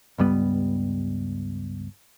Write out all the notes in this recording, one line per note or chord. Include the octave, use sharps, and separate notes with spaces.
C#2 G2 G3 B3